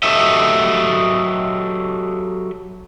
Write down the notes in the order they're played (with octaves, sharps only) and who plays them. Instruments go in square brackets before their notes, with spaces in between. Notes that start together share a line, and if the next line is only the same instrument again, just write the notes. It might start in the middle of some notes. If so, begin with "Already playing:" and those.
[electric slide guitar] F#3 F#4 G4 A4 D#5 E5